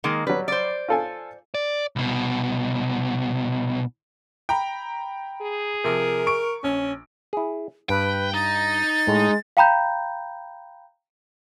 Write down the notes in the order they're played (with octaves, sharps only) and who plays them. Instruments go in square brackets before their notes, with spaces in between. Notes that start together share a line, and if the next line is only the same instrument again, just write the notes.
[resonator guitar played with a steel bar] D#3 G#3 A#3
[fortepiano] F#3 G3 [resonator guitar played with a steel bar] B4
[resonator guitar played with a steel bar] C5 D5
[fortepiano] F4 A4 G#5
[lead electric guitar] D5
C2 B2
[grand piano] G5 A#5 B5
[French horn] G#4
[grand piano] C3 F3 [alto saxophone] A#4
[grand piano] C#6 D7
[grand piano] A#1 [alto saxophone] C#4
[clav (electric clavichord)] E4 G#4
[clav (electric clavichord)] G2 [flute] B4 [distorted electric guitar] G5
[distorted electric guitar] D#4 [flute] A6
[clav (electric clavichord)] A2 [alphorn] G#3
[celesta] F5 G5 A#5 B5 G6